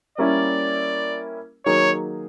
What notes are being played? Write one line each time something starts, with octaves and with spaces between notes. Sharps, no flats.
G3 A#3 C#4 E4 D5
D#3 F#3 A#3 D#4 G#4 C#5